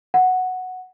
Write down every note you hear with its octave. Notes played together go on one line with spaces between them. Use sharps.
F#5